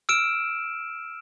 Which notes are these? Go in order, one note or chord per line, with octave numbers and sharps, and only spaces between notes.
E6 F6 D7 E7